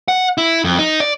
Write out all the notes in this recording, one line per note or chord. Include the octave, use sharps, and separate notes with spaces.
F#5
E4
F2
D#4
D5